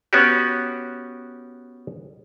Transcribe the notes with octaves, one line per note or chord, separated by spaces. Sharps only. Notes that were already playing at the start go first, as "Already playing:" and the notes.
B3 C#4 F#4 G4